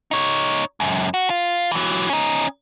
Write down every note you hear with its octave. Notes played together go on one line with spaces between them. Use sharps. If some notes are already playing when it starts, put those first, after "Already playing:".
D#4 C#5
C#2 F#2
F#4
F4
E3 F#3
C#4 D#4